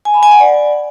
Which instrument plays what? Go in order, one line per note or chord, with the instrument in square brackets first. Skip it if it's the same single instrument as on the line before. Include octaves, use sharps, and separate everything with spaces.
[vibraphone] G#5
B5
G#5
F#5
D5